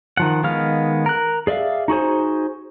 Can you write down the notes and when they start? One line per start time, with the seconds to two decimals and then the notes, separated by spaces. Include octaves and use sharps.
0.17 D#3 F3 F#5
0.44 D#3 G#3 B3 F5 F6
1.06 A#4 F#6
1.47 G#4 D5 E5 F5
1.88 D#4 F#4 G#4 C5